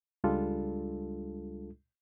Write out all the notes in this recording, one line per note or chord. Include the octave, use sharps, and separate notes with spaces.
C#2 G3 G#3 D4 F4 A4